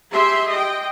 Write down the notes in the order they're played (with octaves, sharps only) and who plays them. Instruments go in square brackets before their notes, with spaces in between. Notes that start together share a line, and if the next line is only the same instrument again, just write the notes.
[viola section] G4 G#4 E5 C6
D#5 G5